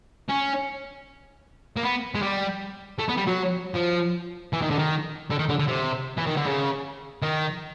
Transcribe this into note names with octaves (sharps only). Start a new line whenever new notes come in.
C#4
A#3
B3
G#3
G3
A3
B3
G3
F#3
F3
E3
D#3
D3
D#3
D3
D#3
D3
D3
C3
E3
D#3
D3
C#3
D#3